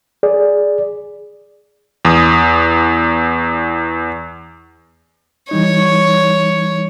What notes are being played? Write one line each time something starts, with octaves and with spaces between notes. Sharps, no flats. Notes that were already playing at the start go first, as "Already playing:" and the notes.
G#4 D5
E2 D#6
E3 G3 D#4 C#5